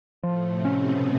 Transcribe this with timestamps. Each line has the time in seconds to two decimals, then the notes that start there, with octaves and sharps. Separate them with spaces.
0.23 A2 F3 A3
0.50 C3 C4
0.65 C#4
0.79 B2 B3